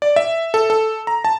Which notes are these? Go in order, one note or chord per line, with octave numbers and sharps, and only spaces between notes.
D5
E5
A4
A4
A#5
A5